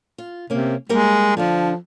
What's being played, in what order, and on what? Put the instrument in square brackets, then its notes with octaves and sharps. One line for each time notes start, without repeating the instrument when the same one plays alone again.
[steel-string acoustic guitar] F4
[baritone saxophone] C3 [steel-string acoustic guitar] A#3 C#4
[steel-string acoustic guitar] G3 A#3 A#4 [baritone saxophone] G#3
[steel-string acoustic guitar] D3 C4 D4 [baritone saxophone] F3